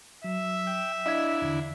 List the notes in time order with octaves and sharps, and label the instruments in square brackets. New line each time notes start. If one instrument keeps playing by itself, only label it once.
[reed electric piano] F#3 [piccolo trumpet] E5
[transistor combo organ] G5
[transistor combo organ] D4 E4 [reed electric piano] D#5 F5 G#6
[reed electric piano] E2 D3